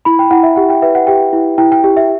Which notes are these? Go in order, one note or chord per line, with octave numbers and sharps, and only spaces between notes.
E4 B5
G5
E4 F#5
E5
G4 F#5
G5
B4 E5
F#5
G4 G5
E4
E4 G5
G5
G4
E5